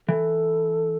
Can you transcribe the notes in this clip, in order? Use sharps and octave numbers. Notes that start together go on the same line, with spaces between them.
E3 A4